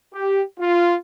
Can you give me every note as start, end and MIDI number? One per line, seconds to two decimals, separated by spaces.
0.14 0.41 67
0.60 0.95 65